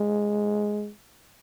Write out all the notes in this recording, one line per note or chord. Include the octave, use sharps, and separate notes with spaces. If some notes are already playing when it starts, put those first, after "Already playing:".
Already playing: G#3